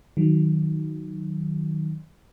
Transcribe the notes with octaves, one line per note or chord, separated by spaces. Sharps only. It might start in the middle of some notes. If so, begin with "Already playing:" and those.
D#3 F#3